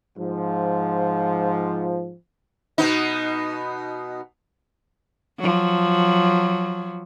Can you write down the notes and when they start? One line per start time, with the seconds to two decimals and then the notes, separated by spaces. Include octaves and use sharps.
0.18 G#2 F3
2.78 B2 B3 D#4
5.38 F3 F#3